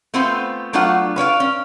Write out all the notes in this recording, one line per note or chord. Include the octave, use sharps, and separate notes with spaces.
A3 B3 C4 F4 B4 C5
F#3 A3 B3 D4 F4 F#5
B4 C#5 D5 F5
C#4